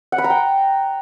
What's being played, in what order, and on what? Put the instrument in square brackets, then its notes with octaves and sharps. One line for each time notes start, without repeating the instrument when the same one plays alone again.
[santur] F#5
B5
A#5
G5